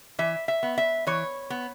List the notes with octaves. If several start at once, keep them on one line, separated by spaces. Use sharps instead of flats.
E3 E5
E5
B3
E5
E3 C#5
B3